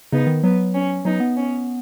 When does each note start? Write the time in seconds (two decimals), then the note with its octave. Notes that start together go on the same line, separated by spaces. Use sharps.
0.12 C#3 B3 D#4
0.27 D#3
0.43 F#3 B3
0.74 C#4
1.05 F#3 B3 D#4
1.20 B3
1.36 C#4